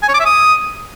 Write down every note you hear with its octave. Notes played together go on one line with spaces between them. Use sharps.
G#5
C#5
D6
E5
D#6